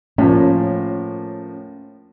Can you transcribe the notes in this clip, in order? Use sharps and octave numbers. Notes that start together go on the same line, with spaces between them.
A2 F3 A#3 C#4